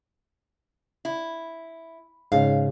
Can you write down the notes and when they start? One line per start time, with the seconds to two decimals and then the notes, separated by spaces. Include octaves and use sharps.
1.05 E4
2.32 G#2 C#3 F5